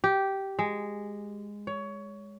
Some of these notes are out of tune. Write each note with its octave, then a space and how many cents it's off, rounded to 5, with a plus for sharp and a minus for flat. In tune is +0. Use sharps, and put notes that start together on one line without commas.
G4 -10
G#3 -10
C#5 +20